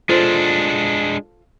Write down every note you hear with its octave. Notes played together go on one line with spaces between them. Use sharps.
G#3 D4 F4 A4 C5